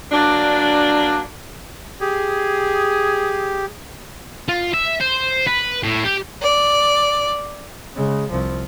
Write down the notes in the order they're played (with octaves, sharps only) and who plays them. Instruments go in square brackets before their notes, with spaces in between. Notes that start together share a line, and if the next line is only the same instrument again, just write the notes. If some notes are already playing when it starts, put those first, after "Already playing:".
[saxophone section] F#3 A#3 D4
[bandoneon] G4 [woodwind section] G#4
[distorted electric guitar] F4
E5
C5
B4
A2
G4
[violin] D5
[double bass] C#3 G#3
C2 F3